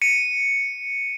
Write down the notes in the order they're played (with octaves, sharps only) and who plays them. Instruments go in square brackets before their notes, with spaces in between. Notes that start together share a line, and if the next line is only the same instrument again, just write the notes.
[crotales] C#7 D#7